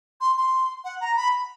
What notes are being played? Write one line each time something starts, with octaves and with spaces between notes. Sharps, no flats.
C6
C6
F#5
A#5
B5